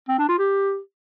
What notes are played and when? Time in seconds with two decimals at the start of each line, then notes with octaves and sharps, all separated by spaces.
0.09 C4
0.19 D4
0.29 F4
0.39 G4